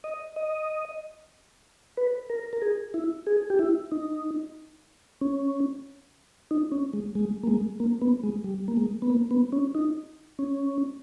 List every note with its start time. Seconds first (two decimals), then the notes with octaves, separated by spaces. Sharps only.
0.04 D#5
0.36 D#5
1.97 B4
2.30 A#4
2.53 A#4
2.62 G#4
2.94 E4
3.27 G#4
3.50 G4
3.59 E4
3.92 D#4
5.21 C#4
6.51 D#4
6.72 C#4
6.93 G#3
7.15 G#3
7.43 A#3
7.47 G#3
7.80 A#3
8.01 B3
8.23 G#3
8.44 G3
8.68 A#3
8.77 G#3
9.02 B3
9.10 A#3
9.31 B3
9.52 C#4
9.75 D#4
10.39 C#4